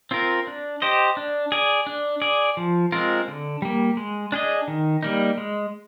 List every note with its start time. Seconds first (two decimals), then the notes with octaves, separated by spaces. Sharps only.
0.11 C4 F4 A#4
0.47 D4
0.82 G4 C5 D#5
1.17 D4
1.52 G#4 D5
1.87 D4
2.22 G#4 D5
2.57 F3
2.92 G#3 C4 F4 A#4
3.28 D3
3.62 G3 A#3
3.97 G#3
4.32 D4 G#4 D#5
4.68 D#3
5.03 G3 A#3 D#4
5.38 G#3